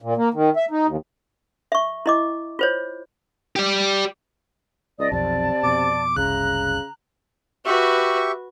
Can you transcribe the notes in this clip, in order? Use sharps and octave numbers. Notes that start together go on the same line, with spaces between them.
A#2
A#3
D#3
E5
D#4
D#2
E5 C#6
E4 D#5 D6
F4 C5 C#5
G4 D5
C#2 D5 D#5 D#6
B1 F2 C3 D5 A5
F2 B2 D6
F#1 C2 C#3 A#5 F#6
F#4 G4 B4 E5 C#6